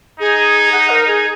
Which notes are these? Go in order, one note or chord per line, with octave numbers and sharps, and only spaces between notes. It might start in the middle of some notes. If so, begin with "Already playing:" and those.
D#4 G#4
F#5
A#4
G#4